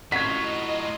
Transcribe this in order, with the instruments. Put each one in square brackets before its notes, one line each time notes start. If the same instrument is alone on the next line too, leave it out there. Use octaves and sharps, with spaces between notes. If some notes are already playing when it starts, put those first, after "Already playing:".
[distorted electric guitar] A2 F4 [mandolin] F#4 [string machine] D#5 [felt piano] G#6 B6